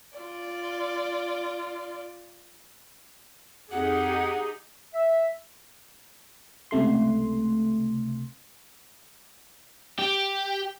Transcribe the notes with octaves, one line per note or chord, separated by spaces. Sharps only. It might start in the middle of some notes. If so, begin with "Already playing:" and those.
F4 D5
F2 D#4 G4 G#4 F#5
E5
C#2 C3 A3 C6
G4